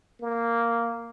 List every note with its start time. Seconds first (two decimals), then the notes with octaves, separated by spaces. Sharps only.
0.20 A#3